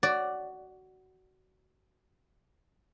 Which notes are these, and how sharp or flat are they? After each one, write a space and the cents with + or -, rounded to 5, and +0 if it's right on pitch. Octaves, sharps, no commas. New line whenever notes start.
F#4 +15 D5 +0